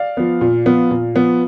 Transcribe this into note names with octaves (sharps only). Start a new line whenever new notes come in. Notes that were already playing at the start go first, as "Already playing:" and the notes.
Already playing: D5 F5
F3 B3
A#2
F3 B3
A#2
F3 B3